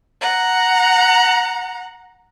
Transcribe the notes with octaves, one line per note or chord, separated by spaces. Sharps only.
F#5 A#5